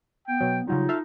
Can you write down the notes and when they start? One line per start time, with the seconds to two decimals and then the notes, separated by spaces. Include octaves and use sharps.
0.28 B3 G5
0.41 B2 F#3
0.68 C#3 F#3 G3 D#4 F4
0.89 A4 E5 F5